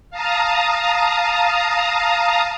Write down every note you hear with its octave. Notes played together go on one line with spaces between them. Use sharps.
F5 A5 A#5 D#6